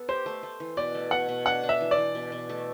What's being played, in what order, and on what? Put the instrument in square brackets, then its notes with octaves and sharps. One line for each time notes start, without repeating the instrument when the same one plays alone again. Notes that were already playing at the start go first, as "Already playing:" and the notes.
Already playing: [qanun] B3 A4
[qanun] G4 [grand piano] C5
[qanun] A3
A3
E3
[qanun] B2 [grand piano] D5
[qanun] A3
[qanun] B2 [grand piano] F#5
[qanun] B2
[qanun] D4 [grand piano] F#5
[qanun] D4
[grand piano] E5
[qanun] E3
[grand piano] D5
[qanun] E3
B2
B2
A3